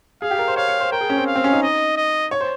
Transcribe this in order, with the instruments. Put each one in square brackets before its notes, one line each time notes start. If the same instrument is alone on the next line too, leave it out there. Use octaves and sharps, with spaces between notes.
[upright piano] G#4 [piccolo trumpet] F5
[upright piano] G4
A#4
C5
[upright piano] C#5 [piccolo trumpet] F5
[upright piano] C#5
C5
[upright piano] A#4 [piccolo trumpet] G5
[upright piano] G#4
C#4
C4
[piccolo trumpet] F5
[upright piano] C4
C#4
D#4
[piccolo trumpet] D#5
D#5
[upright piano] C#5
C5